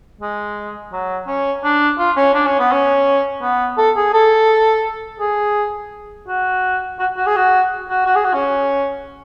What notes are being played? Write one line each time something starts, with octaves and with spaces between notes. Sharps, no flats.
G#3
F#3
C#4
D4
F4
C#4
D4
C#4
B3
C#4
B3
A4
G#4
A4
G#4
F#4
F#4
F#4
G#4
F#4
F#4
F#4
G#4
F#4
C#4